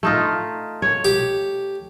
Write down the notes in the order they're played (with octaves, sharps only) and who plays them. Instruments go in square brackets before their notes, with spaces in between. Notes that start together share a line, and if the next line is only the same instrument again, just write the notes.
[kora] A3 D#4 F4
C#5
[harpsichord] G4